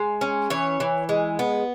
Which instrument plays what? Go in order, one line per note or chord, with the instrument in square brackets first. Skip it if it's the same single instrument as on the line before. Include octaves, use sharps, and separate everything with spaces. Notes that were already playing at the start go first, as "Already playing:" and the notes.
Already playing: [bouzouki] G#3
C#4
E3 C#5
E3
G#3
B3